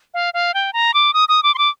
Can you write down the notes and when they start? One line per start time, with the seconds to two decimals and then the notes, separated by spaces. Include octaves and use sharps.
0.14 F5
0.34 F5
0.54 G5
0.73 A#5
0.94 D6
1.14 D#6
1.29 D#6
1.43 D6
1.55 C6
1.58 D6